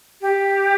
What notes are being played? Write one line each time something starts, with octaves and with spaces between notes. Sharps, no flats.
G4